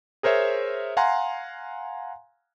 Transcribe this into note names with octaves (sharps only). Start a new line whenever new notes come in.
G#4 A#4 C5 C#5 E5
F5 F#5 G#5 A#5 C6